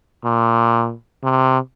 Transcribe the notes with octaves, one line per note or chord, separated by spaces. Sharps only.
A#2
C3